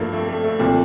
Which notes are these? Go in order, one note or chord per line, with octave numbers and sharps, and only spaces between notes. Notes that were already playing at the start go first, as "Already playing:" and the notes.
Already playing: G2 F3 A3 A#3
A3
A3
A3
C2 A#2 F3